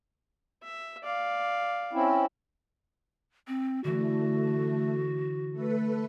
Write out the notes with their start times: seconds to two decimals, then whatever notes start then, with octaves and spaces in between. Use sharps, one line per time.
0.63 E5
1.03 D5 F5
1.93 C4 C#4 E4
3.48 C4
3.84 D3 E3 A3 F#4
5.52 A3 A4 B4